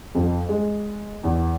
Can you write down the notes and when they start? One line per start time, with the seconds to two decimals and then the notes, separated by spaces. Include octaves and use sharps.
0.15 F2
0.49 G#3
1.24 E2